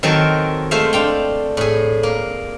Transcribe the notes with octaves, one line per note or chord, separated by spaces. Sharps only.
D#3 F#3 C4 A4 A#4
G#3 A3 C5 E5 F5
D4 F5 G5
A2 G#4
A#3